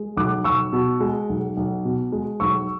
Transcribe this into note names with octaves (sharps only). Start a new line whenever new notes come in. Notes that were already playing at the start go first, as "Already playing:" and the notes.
Already playing: G#3
B1 D6 F#6
B1 C#6 E6
B2
G#3
B1
B1
B2
G#3
B1 C#6 E6